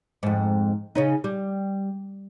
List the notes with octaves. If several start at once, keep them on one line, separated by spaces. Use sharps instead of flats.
F2 G#2
C#3 C#4 D#4
G3